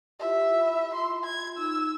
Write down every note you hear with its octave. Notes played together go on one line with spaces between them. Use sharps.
E4 F4 G4 E5
F4 B5
C6
G#6
D#4 E6